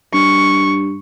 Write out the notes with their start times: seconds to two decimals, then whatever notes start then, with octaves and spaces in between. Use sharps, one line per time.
0.13 G2 C#6